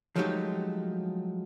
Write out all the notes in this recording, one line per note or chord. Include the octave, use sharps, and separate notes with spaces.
F3 F#3 G#3 A3 D#4 G4